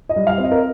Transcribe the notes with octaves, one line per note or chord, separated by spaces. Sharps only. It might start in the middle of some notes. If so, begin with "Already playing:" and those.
D#5
G3
F5
C4
D#5
A#4